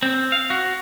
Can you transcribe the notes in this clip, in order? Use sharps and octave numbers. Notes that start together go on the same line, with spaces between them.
C4
F5
F#4